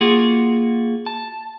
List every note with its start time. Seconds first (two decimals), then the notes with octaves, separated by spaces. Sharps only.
0.01 A#3 F4 F#4 G#4
1.06 A5